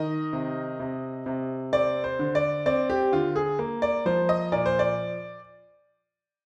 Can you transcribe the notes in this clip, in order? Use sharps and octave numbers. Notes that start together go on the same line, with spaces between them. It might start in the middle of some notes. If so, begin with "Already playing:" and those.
Already playing: D#3 D#5
C3
C3
C3
C4 D5
C5
D3
D5
C4 D5
G4
D3 F4
G#4
A#3
D5
F3 C5
D#5
A#2 D5
C5
D5